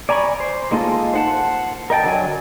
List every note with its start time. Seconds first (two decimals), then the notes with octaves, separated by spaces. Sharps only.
0.09 D5 G#5 A#5 B5 C#6
0.40 C5
0.71 G#3 A#3 D#4 F4 A4
1.14 C5 F#5 A5
1.90 A#4 D#5 G5 A5
2.04 D3 F#3 G#5